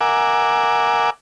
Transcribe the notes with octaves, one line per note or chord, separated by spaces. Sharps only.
A#4 E5 F#5 G#5 D6